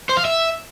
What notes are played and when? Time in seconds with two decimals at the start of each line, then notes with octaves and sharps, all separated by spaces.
0.09 C5
0.17 F5
0.25 E5